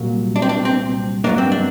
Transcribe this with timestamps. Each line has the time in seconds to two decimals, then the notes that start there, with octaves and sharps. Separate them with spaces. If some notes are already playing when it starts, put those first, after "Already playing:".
Already playing: C2 A#2 F#3 A#3
0.36 D4
0.42 C4
0.49 D4
0.65 C4
1.24 G2 F#3 A#3 D4
1.38 C4
1.52 D4